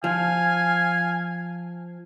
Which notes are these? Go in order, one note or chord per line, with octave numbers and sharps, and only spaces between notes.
F3 F5 G#5